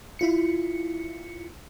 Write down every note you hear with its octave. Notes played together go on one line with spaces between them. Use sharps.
E4 F4 C#7